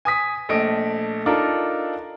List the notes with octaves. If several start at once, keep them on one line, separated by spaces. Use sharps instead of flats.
G#5 D#6 B6
A#1 A3 D#5 D7
D4 D#4 F4 A4 A#4